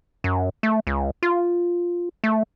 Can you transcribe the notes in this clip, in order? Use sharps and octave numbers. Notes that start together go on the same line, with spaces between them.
F#2
A3
C#2
F4
A3